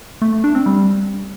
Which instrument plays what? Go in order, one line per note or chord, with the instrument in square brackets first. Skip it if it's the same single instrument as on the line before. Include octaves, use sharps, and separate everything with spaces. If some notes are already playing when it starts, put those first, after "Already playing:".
[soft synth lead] A3
A3
D4
C4
G3